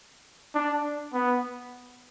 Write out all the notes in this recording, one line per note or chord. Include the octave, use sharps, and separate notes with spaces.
D4
B3